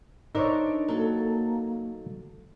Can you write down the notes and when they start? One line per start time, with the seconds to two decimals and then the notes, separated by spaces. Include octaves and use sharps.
0.35 D4 D#4 A#4 C5 C#5 E5
0.88 F#3 A#3 A4